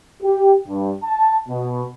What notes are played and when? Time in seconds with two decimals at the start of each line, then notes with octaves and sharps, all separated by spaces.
0.22 G4
0.66 G2
1.03 A5
1.48 B2